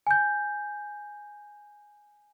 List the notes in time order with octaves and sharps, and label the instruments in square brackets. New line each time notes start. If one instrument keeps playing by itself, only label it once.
[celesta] G#5 G6